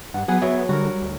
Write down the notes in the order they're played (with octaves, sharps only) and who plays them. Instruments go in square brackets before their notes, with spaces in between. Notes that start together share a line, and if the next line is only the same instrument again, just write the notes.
[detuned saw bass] G2 [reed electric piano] F#5
[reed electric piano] F#3 F#5 [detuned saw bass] B3 [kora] G#4 B4
[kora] F#3 [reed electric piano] E5
[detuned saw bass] D3 [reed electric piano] G3 [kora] F#4 A#4
[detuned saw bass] D2